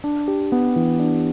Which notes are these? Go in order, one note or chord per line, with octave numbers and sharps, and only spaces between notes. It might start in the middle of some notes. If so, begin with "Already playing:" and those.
D4
G4
B3
E3
D4